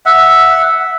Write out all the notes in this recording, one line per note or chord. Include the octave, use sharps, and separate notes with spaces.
E5 F#5